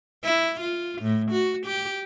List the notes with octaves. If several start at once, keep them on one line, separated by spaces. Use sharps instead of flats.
E4
F4
A2
F#4
G4